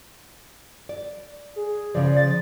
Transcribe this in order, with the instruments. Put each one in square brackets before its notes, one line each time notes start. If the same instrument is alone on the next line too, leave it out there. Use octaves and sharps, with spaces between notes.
[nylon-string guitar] D5
[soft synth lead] G#4
[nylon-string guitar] C#3 F3 [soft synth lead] D5
[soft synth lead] A6